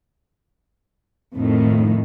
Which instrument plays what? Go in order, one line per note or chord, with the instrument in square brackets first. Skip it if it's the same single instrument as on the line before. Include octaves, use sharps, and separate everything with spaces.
[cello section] F2 A2 D#3 A3